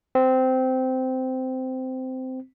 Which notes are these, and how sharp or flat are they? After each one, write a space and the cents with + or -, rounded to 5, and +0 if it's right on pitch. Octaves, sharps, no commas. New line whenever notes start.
C4 -15